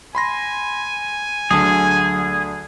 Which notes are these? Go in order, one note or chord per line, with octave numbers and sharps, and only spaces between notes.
G#5 B5 C6 A#6
D2 D3 F#3 F#4 G#4 A5